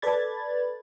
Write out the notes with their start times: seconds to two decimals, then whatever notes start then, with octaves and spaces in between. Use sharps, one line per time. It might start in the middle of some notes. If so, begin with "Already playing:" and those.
0.02 A4 B4 D5 B5 G#6 A6